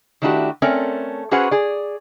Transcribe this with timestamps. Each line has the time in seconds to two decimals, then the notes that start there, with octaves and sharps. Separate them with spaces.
0.22 D#3 A3 D4 E4 F#4 G4
0.62 A3 C4 C#4 A#4 D5
1.31 C#4 F#4 G#4 B4 C5 F#5
1.51 G#4 D5